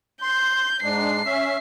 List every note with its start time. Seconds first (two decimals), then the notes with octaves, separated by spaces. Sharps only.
0.22 C6 G6
0.83 G#2 G#3 D4 C7
1.25 C#4 E5